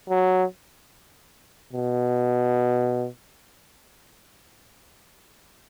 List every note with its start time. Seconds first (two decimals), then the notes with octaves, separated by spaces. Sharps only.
0.10 F#3
1.73 B2